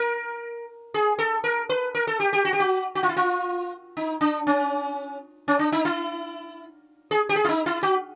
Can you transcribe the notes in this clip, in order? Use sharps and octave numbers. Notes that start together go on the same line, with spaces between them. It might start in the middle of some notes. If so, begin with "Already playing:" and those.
Already playing: A#4
G#4
A4
A#4
B4
A#4
A4
G4
G4
F#4
G4
F#4
F#4
F4
E4
F4
D#4
D4
C#4
C#4
D4
D#4
E4
G#4
G4
G#4
E4
D#4
E4
F#4